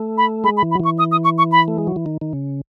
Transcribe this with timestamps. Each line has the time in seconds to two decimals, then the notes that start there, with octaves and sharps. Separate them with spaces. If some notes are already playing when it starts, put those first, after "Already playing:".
Already playing: A3
0.18 B5
0.44 G#3 B5
0.57 B5
0.63 E3
0.71 B5
0.75 F#3
0.80 E3
0.85 C#6
0.99 D#6
1.12 D#6
1.24 C#6
1.38 C#6
1.52 B5
1.68 A3
1.78 G#3
1.87 F#3
1.96 E3
2.06 D#3
2.21 D#3
2.33 C#3